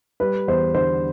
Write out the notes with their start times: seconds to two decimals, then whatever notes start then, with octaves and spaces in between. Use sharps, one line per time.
0.20 G3 B4
0.47 E2 C5
0.74 D3 C5